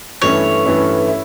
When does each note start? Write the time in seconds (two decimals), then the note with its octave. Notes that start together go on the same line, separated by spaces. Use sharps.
0.22 G2 E3 A3 C#4 E4 C#5
0.65 G2 E3 A3 C#4 E4
1.08 E4